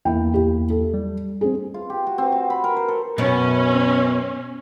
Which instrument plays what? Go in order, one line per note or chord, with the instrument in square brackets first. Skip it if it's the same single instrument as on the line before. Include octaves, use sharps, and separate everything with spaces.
[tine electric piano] E2 A#3 E4 [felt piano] G5
[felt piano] G4
A4
[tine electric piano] G3
[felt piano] C4 G#4
[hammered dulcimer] F4
G4
F#4
C4
F#4
B5
A#4
C5
A4
[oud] F#2 B2 B3 [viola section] C#4